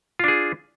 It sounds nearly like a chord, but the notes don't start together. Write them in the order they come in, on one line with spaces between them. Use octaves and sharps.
F4 D4 G#4